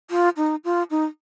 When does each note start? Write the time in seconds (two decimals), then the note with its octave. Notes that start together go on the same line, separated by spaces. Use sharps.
0.11 F4
0.37 D#4
0.64 F4
0.91 D#4